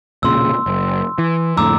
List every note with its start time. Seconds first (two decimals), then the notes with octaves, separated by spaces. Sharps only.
0.23 E1 A#2 C#3 C6 E6
0.66 F#1
1.18 E3
1.57 F2 A2 D3 A#5 D6 E6